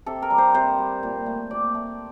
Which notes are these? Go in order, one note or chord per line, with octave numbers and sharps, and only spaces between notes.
C3 A4
A#4
G3
C5
C3 C5
G3
A#2
A3
A#2 D5
A3